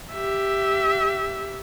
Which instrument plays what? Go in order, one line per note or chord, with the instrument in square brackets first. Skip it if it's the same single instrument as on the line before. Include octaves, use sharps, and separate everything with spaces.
[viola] G4 E5